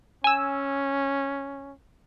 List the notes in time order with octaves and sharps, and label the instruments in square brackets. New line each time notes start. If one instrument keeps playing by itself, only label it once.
[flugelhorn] C#4 [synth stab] G#5 E6